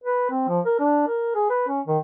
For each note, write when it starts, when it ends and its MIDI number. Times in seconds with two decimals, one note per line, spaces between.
0.04 0.29 71
0.30 0.47 60
0.48 0.60 53
0.66 0.80 70
0.80 1.03 62
1.08 1.33 70
1.35 1.50 68
1.50 1.64 71
1.68 1.81 61
1.87 1.98 51